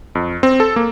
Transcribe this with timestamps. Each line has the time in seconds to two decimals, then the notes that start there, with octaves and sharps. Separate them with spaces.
0.15 F2
0.43 C4
0.60 A4
0.76 A#3